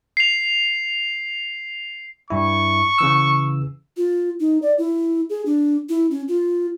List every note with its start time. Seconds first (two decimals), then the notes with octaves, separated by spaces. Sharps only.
0.17 C7 F7
2.30 G2 E4 C#6
2.98 C#3 E3 E6
3.97 F4
4.40 D#4
4.62 D5
4.78 E4
5.30 G#4
5.46 D4
5.89 E4
6.11 C#4
6.28 F4